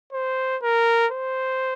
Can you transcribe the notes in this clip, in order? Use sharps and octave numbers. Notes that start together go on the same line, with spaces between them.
C5
A#4
C5